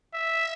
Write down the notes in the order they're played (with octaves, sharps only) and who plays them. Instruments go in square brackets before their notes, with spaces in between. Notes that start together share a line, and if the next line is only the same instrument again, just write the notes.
[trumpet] E5